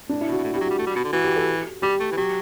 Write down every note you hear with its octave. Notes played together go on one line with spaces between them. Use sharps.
A2 D4
E4
B2
F#4
B2
A2
B2
G4
F#3
G3 F#4
A3
G3
B2
D3
E3 F#4
G4
A4
G3 G4
A3
E3
F#3 G4